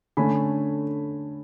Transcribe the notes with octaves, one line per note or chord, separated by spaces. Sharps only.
D3 A3 C#4 G#5 B5